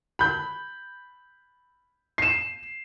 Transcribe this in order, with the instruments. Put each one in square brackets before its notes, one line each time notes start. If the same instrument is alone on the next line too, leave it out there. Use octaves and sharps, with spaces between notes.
[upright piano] B5 G6
[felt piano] C7 E7